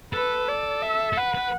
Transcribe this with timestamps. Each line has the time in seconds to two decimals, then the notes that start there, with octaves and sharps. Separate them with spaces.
0.13 A4 B4
0.48 D5
0.82 E5
1.13 A4
1.17 B4 F#5
1.34 B4